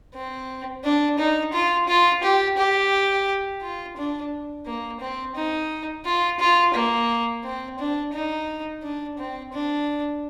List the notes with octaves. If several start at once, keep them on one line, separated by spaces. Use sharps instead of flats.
C4
D4
D#4
F4
F4
G4
G4
F4
D4
A#3
C4
D#4
F4
F4
A#3
C4
D4
D#4
D4
C4
D4